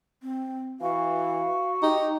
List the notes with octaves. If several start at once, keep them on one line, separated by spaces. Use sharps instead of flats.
C4
E3 F#4 F5
D#4 G4